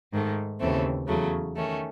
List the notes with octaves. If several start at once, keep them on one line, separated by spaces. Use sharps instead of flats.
G#2 D#3 A3
D#2 C#3 E3 A3 C4
E2 C#3 F#3 A3
D#3 A3 C#4